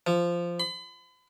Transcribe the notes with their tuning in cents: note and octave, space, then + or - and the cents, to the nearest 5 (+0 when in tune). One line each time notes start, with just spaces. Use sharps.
F3 -10
B5 +40